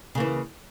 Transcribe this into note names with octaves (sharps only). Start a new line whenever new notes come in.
C#3 E3 A#3